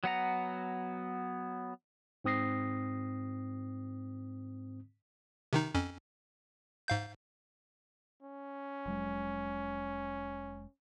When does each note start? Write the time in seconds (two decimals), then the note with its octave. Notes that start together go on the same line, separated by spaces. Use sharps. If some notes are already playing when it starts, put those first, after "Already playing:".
0.04 F#3 B3 F#5 A#5
2.24 G#2 C4 D#6 A#6 C7
5.53 C3 D#3 D#4
5.75 F2 C#4
6.88 G#2 F5 G6
8.22 C#4
8.85 F1 F#3 G#3